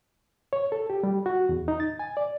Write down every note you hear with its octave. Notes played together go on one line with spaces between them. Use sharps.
C#5
A4
G4
G3
F#4
E2
D#4
A6
G#5
D5